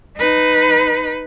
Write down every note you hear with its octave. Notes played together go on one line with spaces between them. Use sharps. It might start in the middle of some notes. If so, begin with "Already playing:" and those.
D#4 B4